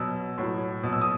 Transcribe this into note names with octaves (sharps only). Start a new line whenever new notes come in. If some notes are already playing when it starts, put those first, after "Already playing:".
Already playing: B2 F#3 E6
A2 F#3
B2 F#3
E6
D#6